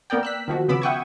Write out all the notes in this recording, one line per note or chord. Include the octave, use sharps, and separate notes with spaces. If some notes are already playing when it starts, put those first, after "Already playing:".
A#3 B3 A#4 D5 G5
E6 F#6 B6
D#3 F3 F#4
C#3 B3 B5 D6 E6
E5 F#5 G5 C#6 D#6 G#6